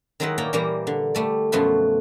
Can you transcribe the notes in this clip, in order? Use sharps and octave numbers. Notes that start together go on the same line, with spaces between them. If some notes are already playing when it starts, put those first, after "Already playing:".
D#3 F#3 G#3 D#4 E4 B4
A#2 A#3 C#5 D5 G5 A#5
A#2 E3 G3 A#3 G4 A#5
D3
G3 A3 D5
F#2 B2 F3 A3 B4 C6